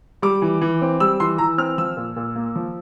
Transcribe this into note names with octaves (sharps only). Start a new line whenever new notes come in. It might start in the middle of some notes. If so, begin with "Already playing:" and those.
G3 D6
E3
E3
C4
G3 E6
E3 C6
E3 A#5
C4 F6
F3 E6
A#2
A#2
A#3
F3